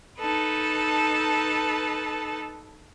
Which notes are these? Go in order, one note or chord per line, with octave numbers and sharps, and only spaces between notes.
D#4 A4 B4 A5